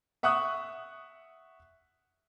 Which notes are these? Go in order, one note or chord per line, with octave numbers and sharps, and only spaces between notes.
E5 F#5 C#6 D#6 F#6